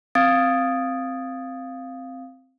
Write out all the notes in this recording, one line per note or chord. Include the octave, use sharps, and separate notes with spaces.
C4 F5 D#6 G#6 A6 D7